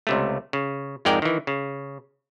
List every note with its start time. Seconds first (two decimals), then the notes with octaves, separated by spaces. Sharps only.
0.07 C#2 C3 A3
0.53 C#3
1.05 F2 G#2 G#3 A#4 D5 G5
1.22 D#3 E3
1.47 C#3